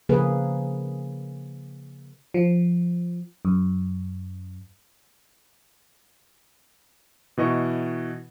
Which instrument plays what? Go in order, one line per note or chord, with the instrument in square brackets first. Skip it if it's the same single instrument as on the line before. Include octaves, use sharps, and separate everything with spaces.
[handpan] C#3 F3 A#3 G#4 B4
[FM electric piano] F3
F#2
[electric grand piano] B2 E3 D#5 C#6